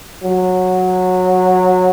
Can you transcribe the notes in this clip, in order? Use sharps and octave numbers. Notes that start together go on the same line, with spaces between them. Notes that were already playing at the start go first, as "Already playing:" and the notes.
F#3